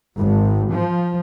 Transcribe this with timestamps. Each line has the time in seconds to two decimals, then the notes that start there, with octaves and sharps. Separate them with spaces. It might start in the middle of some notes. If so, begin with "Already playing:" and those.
0.18 G#1
0.73 F3